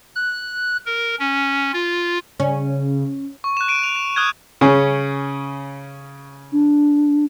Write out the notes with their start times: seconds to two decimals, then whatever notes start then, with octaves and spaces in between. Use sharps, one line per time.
0.15 F#6
0.86 A#4
1.19 C#4
1.73 F4
2.40 C#3 C#4
3.44 C#6
3.57 F#6 E7
3.68 D7 D#7
3.83 F7
3.96 E7
4.16 D#6 F6 F#6 G#6
4.61 C#3 C#4
6.52 D4